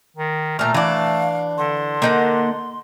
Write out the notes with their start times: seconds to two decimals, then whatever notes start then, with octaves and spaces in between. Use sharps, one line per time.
0.17 D#3
0.59 A#2 A3 A#5 F6
0.74 E3 D4 F5
1.58 D3 C6
2.02 A#3 D#4 F#5